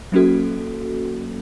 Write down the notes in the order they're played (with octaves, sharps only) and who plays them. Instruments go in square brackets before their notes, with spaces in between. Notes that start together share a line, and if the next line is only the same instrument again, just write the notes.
[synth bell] F#3 A#3 C#4 F#4 A4